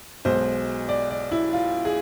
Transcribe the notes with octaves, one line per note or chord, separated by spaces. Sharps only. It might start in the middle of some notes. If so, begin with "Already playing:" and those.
B1 B2 G#3 C5
D5
D5
E4
F4
G#4